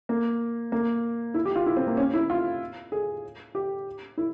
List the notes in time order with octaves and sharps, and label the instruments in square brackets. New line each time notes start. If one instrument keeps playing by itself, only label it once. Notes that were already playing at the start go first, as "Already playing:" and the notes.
[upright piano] A#3
A#3
E4
G4
F4
E4
C4
A#3
C#4
E4
F4
G#4
G4
E4